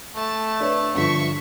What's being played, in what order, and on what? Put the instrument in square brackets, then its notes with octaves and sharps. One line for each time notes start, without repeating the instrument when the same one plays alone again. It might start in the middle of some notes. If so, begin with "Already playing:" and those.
[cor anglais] A3 [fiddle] A5
[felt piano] D4 B4 C#5
[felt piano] G2 D3 F3 [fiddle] E5 C#6